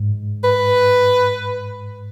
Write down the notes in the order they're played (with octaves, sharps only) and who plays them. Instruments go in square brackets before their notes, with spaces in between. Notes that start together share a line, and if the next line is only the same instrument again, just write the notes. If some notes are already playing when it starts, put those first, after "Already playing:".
Already playing: [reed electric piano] G#2
[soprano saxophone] B4